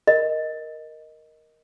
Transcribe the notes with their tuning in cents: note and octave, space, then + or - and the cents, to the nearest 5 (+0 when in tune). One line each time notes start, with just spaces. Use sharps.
A#4 +5 D#5 +0